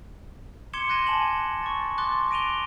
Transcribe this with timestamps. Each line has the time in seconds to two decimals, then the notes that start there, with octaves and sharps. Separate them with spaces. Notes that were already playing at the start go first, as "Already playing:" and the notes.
0.73 C6 D6 G#6 C#7 E7 G7
0.89 C6 F#6 G#6 A#6 D#7 E7
1.06 G#5 A5 E7 F#7
1.63 C#6 A6
1.98 C6 D6 F#6 A6
2.31 A#6 D7 D#7 F7 G7